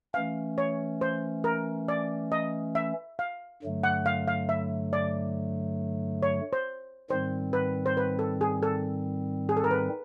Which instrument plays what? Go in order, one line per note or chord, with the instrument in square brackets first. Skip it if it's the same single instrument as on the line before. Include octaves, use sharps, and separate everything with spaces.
[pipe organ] E3 A3 C#4 [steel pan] F5
[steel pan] C#5
C5
A#4
D5
D#5
E5
F5
[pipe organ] G2 D3 F#3 A3
[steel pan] F#5
F5
F5
E5
D5
C#5
C5
[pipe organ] G#2 D#3 G3 C4 [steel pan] C5
[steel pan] B4
C5
B4
A4
G#4
A4
G#4
A4
A#4
B4